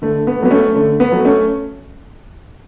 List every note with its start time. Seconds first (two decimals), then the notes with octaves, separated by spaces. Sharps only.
0.02 D3 A3
0.27 B3
0.39 A3
0.42 F#3 B3
0.51 A3 C#4
0.76 D3 A3
1.00 B3
1.12 F#3 A3
1.25 A3 C#4